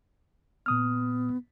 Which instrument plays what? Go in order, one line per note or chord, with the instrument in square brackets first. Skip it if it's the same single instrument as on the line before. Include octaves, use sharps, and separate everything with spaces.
[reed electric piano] A#2 D#6 F6 [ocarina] B3